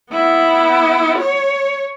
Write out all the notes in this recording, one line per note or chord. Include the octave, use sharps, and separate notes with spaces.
B3 E4
C#5